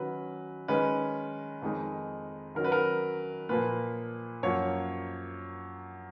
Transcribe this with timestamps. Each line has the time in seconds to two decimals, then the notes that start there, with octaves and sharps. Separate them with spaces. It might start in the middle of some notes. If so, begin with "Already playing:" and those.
Already playing: D#3 F#3 C#4 B4
0.68 D#3 G#3 C#4 B4
1.62 F2 D#3 G#3 D#4
2.55 D#3 F#3 C#4 A#4
2.64 B4
2.72 A#4
3.49 A#2 F3 A#3 B4
4.43 F#2 F3 A#3 C#5